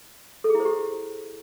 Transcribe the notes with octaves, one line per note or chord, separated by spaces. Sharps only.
A4
G#4
E4
C5
G4